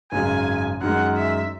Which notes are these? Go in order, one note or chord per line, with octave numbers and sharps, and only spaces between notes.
G#1 F#2 C#3 G#3 G#5
F#2 D#3 G#3 F#5
E5